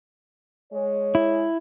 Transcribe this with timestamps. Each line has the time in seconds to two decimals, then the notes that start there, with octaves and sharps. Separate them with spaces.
0.72 G#3 C#5
1.15 E4